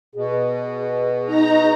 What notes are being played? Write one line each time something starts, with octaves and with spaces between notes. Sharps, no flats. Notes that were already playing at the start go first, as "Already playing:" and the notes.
B2 G#4
D#4 A#5